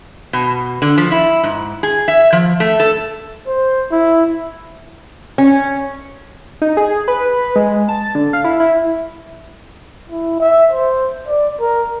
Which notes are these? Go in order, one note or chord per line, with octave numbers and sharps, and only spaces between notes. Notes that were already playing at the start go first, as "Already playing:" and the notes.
B2
D3
F3
E4
G#2
G#4
E5
F3
A3
A4
C5
E4
C#4
D#4
G#4
B4
G#3
A5
D3
F5
E4
E4
E4
E5
C5
D5
A#4